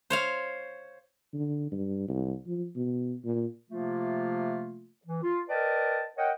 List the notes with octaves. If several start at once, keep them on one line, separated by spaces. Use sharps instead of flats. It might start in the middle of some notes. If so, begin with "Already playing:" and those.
C5 C#5 F5
D3
G2
C2
F3
B2
A#2
C3 F3 A3 A#3 F4
E3
F4
A#4 B4 D5 D#5 G5 A5
A#4 C#5 D#5 F#5 G5